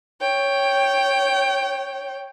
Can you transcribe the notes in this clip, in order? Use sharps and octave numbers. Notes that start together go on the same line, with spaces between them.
C#5 G5